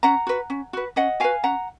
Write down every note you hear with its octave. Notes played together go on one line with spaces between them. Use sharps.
C#4 F#5 A#5
F#4 B4
C#4
F#4 B4
C#4 D#5 F#5
F#4 B4 F5 G#5
C#4 F#5 A#5